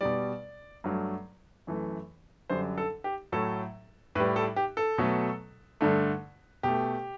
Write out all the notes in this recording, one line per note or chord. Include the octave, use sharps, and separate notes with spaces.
B2 G3 D5
G2 F#3 A3
F#2 E3 A3
F#2 D3 G3 C5
A4
G4
A2 F#3 A3 A4
A2 G3 B4
A4
G4
A4
B2 F#3 A3
G2 D3 A3
B2 A3 G4